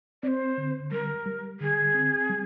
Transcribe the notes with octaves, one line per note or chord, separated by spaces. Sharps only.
C4 C5 D5
D3
G3 A#4
G3
D3 G#4
C4
G3